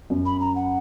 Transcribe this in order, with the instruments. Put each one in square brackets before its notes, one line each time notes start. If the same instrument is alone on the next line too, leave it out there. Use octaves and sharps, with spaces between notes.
[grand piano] F#2
[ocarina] B5
A#5
F#5